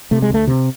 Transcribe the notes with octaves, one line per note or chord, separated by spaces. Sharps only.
C3 A3
G#3
D2 A3
C3